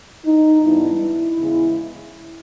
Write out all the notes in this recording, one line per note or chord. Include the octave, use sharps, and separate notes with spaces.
D#4
G#2 E3 G3 B3 D4 E4
E2 C#3 E3 G#3